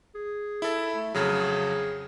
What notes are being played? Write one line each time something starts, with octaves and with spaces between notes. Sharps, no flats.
G#4
E4 A4
A3
F2 C#3 F#3 G#4